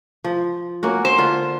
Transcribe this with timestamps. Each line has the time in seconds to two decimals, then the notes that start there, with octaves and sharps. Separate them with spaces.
0.24 F3
0.83 A#3 C#4 F#4
1.05 C5
1.18 D3 F4